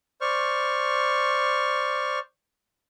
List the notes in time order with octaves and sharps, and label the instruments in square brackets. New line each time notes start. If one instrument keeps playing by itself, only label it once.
[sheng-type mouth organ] C5 D5 C#6 F6